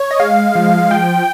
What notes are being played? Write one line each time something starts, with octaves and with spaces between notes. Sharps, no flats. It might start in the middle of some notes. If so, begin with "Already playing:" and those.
Already playing: C#5
D#5
G#3 F5
F3
F3 G5